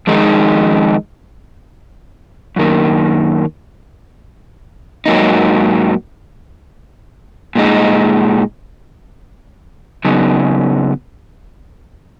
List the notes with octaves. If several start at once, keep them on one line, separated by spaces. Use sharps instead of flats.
F2 D#3 G#3 D#4
F#2 D#3 A#3
G#2 F#3 A#3 D#4
A#2 G#3 D#4
C#3 F#3 B3 D#4